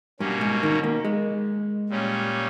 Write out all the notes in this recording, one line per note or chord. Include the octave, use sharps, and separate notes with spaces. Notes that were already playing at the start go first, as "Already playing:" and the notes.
G2 B2 A#3 C#4
G#2
D#3
A#3
G#3
A#2 G3 C#4